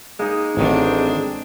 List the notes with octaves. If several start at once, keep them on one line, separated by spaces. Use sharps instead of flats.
G#3 A#3 D#4
A1 D#3 C4 D4